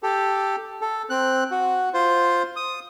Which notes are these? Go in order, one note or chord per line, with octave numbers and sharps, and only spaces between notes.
G4 A4
A4
C4 F#6
F#4
F4 C5
D#6